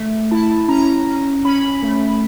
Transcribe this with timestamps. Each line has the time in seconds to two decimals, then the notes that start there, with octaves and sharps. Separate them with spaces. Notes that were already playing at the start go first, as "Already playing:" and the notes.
Already playing: A3
0.31 E4 A5
0.68 C#4 A#5
1.07 C#4
1.45 C#4 B5
1.83 A3